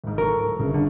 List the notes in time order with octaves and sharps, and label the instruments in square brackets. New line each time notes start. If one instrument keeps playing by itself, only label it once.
[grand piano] G#1 G#2
[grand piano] D1 A4 C#6 [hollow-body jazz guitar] A#4
[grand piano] G1 C#3
[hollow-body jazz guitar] D3